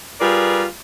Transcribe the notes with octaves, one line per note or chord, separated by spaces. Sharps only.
G3 F4 G#4 A#4 B4 D5